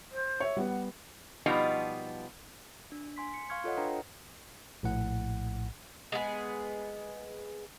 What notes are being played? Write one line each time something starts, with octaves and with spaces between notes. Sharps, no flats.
C5
C#5 E5
G3 B3 F#5
B2 F3 G3 B3 D#4 F4
D4
G#5 C6 B6
C#7
F5 C6 C#6 F6 G#6 C#7
F4 A4 C#5 D#5 F#5
D4 B4 G5 A#5
A#1 A2 F#5
G#3 B3 G#4